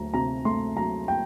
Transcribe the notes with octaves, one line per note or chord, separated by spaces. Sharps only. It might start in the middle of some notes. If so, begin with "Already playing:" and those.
Already playing: D2 F#3 A#5
C3 A#5
A3 C6
F#3 A#5
G5